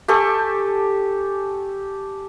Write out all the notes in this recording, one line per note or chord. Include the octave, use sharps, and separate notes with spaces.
G4 A4 G#5 C#6